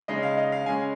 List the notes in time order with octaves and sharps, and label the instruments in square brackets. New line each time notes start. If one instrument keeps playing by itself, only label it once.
[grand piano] C#3 G#3 D#4 D#5
F5
D#5
F5
C#3 G#3 C#4 G#5